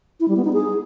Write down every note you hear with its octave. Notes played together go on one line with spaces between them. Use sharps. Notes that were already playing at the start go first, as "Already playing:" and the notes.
E4
G3
B3
D#4
G#4